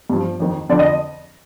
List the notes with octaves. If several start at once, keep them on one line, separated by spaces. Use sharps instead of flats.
G2 F3
F2 D#3
F2 D3 F3 D5
D#5